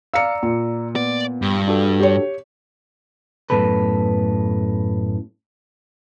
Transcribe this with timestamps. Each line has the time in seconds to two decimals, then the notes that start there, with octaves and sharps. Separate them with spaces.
0.14 D5 F5 A#5 E6 C#7
0.43 A#2
0.96 B3 D5
1.42 G2
1.68 D4 F#4 A4
2.00 G4 C#5
3.50 F#2 A2 D#3 B3 A4 B4